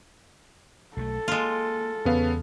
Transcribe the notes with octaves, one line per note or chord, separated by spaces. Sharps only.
B1 F#3 A3 A4
G#3 A#3 F4
E2 C#3 B3 F5